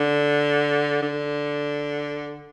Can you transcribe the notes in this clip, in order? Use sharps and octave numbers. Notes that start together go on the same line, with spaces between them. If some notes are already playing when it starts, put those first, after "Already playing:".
Already playing: D3
D3